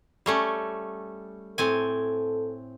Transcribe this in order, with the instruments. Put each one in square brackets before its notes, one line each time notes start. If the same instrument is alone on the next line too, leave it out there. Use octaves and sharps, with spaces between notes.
[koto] G3 A3 C#4
[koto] A2 C4 G#5 [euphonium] A4